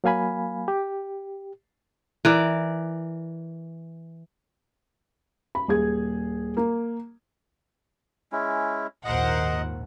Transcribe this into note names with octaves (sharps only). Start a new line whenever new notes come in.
F#3 A#3 F5 G#5 B5
G4
E3 A#4 D5
B5
D#1 G#4 G#6
A#3
G#3 C#4 E4
A#1 D#2 G#2 A#4 C5 D#5 F#5